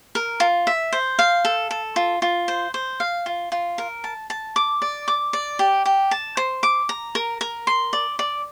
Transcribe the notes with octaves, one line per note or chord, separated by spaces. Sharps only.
A#4
F4
E5
C5
F5
A4
A4
F4
F4
C5
C5
F5
F4
F4
A#4
A5
A5
D6
D5
D6
D5
G4
G4
A5
C5
D6
A#5
A#4
A#4
C6
D5
D5